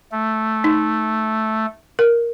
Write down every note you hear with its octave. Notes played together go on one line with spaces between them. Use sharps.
A3
D#4
A#4